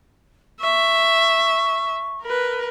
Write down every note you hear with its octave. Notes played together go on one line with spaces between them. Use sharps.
E5 C#6
A#4 B4